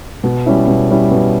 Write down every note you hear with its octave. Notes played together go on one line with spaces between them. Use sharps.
B2
G3 C#4 E4
B2
G3 C#4 E4
B2